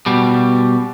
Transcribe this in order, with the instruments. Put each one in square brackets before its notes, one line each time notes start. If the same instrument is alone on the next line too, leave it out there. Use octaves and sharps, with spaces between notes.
[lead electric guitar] B2 G3